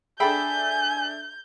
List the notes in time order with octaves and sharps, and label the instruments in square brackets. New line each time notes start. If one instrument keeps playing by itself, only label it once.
[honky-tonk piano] D4 A4 E5 [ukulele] G#4 G5 B5 [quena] G#5 [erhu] G6